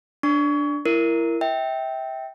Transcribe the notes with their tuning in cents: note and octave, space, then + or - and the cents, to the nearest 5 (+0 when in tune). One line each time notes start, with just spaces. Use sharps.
D4 +0 C#6 +30
E4 +25 A#4 +0
E5 -25 G5 -5